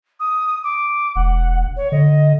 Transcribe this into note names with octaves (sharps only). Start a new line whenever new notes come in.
D#6
D6
E1 F#5
C#5
D3 D#5